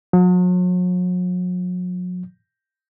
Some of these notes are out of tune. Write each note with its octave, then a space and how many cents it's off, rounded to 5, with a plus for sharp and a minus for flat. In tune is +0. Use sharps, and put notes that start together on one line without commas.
F#3 -40